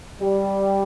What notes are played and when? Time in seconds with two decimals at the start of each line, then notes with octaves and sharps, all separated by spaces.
0.20 G3